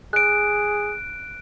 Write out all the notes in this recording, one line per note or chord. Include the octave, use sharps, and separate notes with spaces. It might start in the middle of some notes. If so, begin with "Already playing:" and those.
G#4 F#6 D7